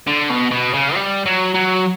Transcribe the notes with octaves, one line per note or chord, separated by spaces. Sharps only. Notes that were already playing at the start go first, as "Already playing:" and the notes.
D3
B2
B2
C#3
G3
F#3
F#3